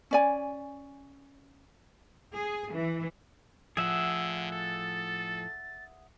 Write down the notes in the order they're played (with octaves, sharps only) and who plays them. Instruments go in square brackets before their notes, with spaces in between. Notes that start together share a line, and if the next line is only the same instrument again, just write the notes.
[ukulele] C#4 D5 G#5
[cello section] G#4
E3
[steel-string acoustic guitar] A2 F3 [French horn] D3 [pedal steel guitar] G#4 E5 F#5 [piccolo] E6
[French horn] A4 [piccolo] A6